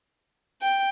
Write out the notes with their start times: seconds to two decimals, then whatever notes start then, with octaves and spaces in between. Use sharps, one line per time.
0.62 G5